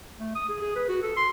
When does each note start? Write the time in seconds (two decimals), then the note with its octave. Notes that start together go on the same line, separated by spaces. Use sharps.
0.19 A3
0.35 D#6
0.49 G#4
0.61 G#4
0.76 B4
0.89 F#4
1.02 A4
1.16 C6